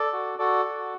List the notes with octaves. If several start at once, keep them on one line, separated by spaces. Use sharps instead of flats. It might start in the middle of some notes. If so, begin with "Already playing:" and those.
Already playing: A4 D5
F#4
F#4 A4 D5
F#4